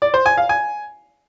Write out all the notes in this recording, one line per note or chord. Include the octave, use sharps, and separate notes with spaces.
D5
C5
G#5
F5
G#5